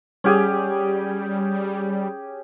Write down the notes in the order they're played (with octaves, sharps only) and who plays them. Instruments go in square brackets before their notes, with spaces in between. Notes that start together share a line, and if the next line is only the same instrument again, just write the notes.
[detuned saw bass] G3 [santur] C#4 G4 G#4